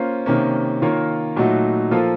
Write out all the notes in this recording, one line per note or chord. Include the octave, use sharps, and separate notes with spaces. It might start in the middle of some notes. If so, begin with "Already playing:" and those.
Already playing: A#3 C#4 F4 C5
C3 D#3 A#3 C#4
D#3 A#3 F4 A#4 C#5
A#2 F#3 A3 D#4 F#4
F3 A#3 F4 A4